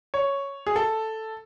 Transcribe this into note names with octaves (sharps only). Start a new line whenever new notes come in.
C#5
G#4
A4